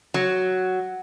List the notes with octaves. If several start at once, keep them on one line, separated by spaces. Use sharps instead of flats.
F#3